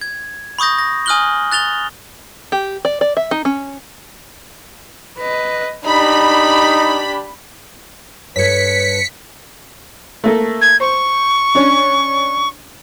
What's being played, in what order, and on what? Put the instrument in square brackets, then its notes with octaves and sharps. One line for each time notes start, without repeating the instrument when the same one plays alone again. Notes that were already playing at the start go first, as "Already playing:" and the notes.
[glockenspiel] G#6
B5 C#6 D#6 G6 A#6
A#6
G#5 D#6 F6 F#6 F#7 G7
F#6 A6 F7 G7
[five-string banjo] G4
D5
D5
E5
D#4
C#4
[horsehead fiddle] B4 D#5
[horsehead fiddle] D4 G4 [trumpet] D#4 [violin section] B5
[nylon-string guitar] G2 A4 [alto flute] B4 [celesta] C#5 G#6 [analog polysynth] B6 C#7
[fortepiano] A3 A#3 A4
[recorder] G#6
[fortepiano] C5 [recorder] C#6
[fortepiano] C#4 D4